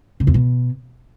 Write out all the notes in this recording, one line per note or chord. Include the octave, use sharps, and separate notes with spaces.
C#3
E2
B2